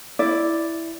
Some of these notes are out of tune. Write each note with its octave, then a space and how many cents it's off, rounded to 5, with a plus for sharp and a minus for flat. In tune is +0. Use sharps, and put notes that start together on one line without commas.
E4 +0 D5 +0